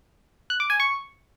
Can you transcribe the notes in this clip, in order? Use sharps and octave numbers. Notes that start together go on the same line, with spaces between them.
F#6
D6
G#5
C#6